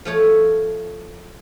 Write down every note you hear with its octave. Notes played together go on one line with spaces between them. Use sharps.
F3 A3 C#5